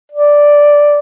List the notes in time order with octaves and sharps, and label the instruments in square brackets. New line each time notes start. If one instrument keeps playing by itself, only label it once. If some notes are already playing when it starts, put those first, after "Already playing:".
[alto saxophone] D5